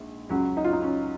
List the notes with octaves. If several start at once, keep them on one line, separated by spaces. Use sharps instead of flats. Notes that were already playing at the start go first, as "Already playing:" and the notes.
Already playing: A#1 G#2
C#2 C#3 F#3 C#4
D#4
F4
D#4
C#4